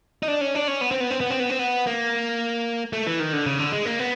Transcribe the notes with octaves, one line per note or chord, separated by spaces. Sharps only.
D#4
D4
C#4
D4
C#4
B3
C4
B3
C4
B3
C4
B3
C4
B3
A#3
A3
E3
D#3
D3
C#3
D3
G#3
A#3
B3